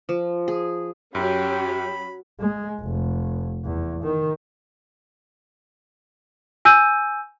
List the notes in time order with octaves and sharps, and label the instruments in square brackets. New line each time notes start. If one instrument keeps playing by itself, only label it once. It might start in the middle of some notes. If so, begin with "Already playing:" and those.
[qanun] F3
G#4
[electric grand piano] F#2 [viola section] F#3 C#4 [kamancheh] G4 [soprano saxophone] B5
[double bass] G#3
F1
E2
D#3
[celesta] G#5 E6 G6 D#7